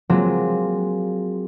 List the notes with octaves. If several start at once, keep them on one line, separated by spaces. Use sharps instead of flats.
F#3 G#3 A#3 C4 F4